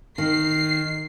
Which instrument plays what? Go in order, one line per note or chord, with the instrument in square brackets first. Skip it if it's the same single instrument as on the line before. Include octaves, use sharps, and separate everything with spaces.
[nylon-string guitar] D#3 [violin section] C7